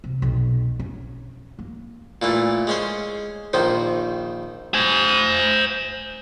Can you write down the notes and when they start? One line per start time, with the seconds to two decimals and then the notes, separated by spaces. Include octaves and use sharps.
0.04 C3
0.22 B1
0.79 C#4
1.59 A#3
2.22 A#2 E3 A3
2.67 G#3 C#4 C5
3.53 A#1 D#3 D#4 C5
4.74 C5 G#5